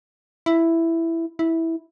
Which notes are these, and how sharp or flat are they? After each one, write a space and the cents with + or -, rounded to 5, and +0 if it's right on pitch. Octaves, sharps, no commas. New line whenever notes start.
E4 +5
E4 -10